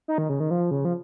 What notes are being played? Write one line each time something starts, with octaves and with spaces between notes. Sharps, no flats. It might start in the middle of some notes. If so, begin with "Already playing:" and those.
D#4
D#3
C#3
D#3
F3
C#3
F3